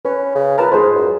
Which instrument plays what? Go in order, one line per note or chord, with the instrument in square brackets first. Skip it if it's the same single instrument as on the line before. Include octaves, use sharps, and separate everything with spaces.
[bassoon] C#4 [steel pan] B4
[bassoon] C#3
[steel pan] F4 B4 A5 [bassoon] A#4
[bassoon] G#2 [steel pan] G#4 C5
[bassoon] F#2